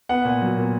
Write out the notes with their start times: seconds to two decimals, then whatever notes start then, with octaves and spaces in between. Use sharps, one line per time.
0.09 B3 F#5
0.25 A#2
0.42 F#3
0.57 A#2